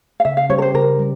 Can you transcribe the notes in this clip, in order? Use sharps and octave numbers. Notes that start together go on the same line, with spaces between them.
F5
C#3 E5
F5
G3 C#4 G4 C5 C#5
A#4
C5
C#3 A#4
G3